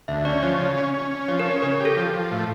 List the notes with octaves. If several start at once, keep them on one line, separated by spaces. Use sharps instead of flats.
D2 E5
C#4 D5
F3 C#5
C#3
C#4
C#4
C#4
F3 C#5
A#4
C#4
C#5
C#3 A#4
A#4
G4
A4
F3
F3
A2